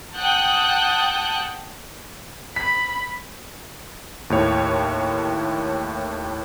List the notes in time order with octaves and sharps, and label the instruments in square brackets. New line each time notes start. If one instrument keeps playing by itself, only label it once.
[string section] F#5 G5 A5 D#6 F#6 G6
[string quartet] B5 [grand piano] B6
[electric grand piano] D#2 A2 C#5